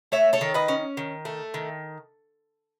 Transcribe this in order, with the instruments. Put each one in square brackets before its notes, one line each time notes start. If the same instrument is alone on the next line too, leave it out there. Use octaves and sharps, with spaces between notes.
[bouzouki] A3 C#5 E5
A4 C#5
D#3
B4 D#5
C#4
D#3
A3
D#3